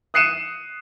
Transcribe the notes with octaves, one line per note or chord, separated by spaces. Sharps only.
D#6 F#6 C7 C#7 D#7 E7